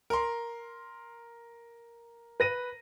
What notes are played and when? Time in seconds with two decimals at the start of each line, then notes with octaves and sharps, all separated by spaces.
0.10 A#4 C6
2.40 B4 A#6 D#7